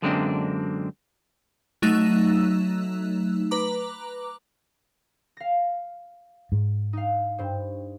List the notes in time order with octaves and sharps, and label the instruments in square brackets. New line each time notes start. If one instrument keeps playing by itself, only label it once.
[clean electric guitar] F#2 D3 G#3 A#3 C4 D4
[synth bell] F#3 A3 D#4 E6 F#6 E7
B4 A#5 D6
[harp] F5 A#6
[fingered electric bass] G#2
[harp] D#4 F5
G2 C5